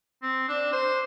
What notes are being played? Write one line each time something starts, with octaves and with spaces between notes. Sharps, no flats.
C4
D4
C5